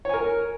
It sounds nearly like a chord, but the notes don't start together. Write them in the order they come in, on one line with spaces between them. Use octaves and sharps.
C#5 G#5 A#4